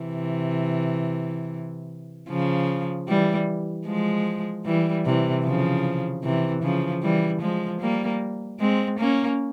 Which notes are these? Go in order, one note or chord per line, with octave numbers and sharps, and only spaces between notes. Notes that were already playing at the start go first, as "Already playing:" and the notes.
Already playing: C3 E3
C#3 F3
E3 G3
F3 G#3
E3 G3
C3 E3
C#3 F3
C3 E3
C#3 F3
E3 G3
F3 G#3
G3 A#3
G#3 C4
A#3 C#4